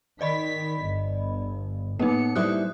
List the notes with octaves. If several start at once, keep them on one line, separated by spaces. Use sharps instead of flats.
D#3 D5 D#5 B5 B6
G1
A2 A#3 B3 D#4 C#7
G3 E4 C5 D#6 F#6